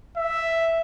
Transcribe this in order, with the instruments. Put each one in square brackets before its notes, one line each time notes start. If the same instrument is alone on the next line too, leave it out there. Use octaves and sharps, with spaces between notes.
[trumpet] E5